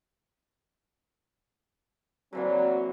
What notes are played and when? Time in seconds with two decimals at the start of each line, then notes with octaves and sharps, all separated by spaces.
2.33 D3 E3 F#3 A#3 C4